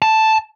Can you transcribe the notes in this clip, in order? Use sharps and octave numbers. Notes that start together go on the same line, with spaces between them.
A5